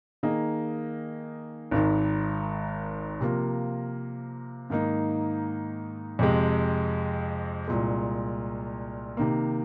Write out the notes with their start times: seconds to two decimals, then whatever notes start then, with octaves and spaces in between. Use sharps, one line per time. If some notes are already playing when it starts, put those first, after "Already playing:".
0.23 D#3 A#3 G#4 D#5
1.71 G#1 G#2 D#3
3.20 C3 F3 A#3 F4 A#4
4.70 G#2 D#3 A#3 D#4
6.19 F2 C3 G#3
7.68 C2 A#2 G#3
9.17 C3 D#3 A#3